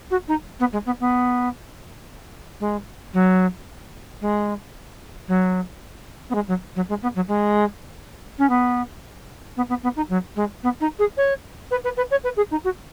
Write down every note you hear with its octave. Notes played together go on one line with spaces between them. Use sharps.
F#4
D#4
B3
G#3
B3
B3
G#3
F#3
G#3
F#3
B3
G#3
F#3
F#3
G#3
B3
F#3
G#3
C#4
B3
B3
B3
B3
D#4
F#3
G#3
B3
D#4
G#4
C#5
B4
B4
B4
C#5
B4
G#4
D#4
F#4